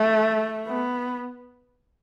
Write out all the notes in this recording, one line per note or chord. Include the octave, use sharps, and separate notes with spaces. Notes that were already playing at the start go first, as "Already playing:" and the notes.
Already playing: A3
B3